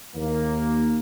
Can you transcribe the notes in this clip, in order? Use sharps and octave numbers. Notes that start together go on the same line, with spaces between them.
D#2 A#3